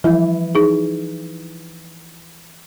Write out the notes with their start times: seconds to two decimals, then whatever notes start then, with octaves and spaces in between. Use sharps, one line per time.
0.04 E3 F3 G3 E4
0.55 D#4 G#4